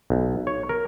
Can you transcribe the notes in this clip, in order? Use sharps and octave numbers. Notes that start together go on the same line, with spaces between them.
B1
C#5
A#4